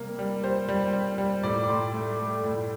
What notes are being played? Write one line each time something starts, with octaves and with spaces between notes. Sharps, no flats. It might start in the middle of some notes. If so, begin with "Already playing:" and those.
Already playing: C3 G3 A#3
G3
G3 C5
G3
G3
G3
A2 D5
D6
A2 C6
A3
A3
A2